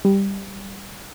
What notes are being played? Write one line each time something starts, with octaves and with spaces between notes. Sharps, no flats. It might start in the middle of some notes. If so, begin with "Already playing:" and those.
G3